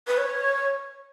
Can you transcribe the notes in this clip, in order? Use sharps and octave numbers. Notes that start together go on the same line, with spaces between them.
B4
C#5